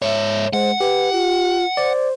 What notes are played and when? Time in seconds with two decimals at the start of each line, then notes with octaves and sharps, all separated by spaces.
0.02 G#2 C#5 E5
0.53 G#3 C5 F#5
0.81 G4 B4
1.13 F4
1.77 C5 D5